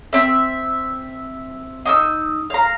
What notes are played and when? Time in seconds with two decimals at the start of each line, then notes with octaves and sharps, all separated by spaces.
0.13 C4 E5
1.86 D#4 D6 E6
2.50 F5 A#5